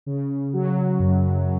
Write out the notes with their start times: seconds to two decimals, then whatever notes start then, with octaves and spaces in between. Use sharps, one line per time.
0.06 C#3
0.53 F#3
0.99 F#2